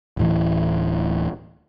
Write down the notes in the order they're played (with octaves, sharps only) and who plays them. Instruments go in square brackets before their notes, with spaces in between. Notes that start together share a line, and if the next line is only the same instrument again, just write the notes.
[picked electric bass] D1 A2 E3